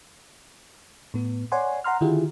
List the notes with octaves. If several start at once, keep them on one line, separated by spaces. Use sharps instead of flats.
A2 B3
C#5 D5 F#5 G#5 C6
F#5 A#5 C6 F6
D3 D#3 E4 F4 G4 G#4